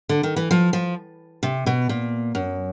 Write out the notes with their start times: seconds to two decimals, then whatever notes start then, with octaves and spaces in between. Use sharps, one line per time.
0.09 D3
0.23 D#3
0.36 E3
0.51 F3
0.73 F3
1.43 C3
1.66 B2
1.89 A#2
2.35 F#2